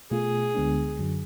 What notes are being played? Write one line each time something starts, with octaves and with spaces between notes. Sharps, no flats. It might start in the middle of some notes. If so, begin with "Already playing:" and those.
B2 A3 F4 G#4
D2 D3 G#3 B3 D4
F#2 D3 F#3